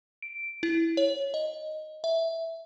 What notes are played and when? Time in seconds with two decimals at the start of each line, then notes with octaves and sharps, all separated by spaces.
0.22 D7
0.63 E4
0.97 C#5
1.34 D#5
2.04 E5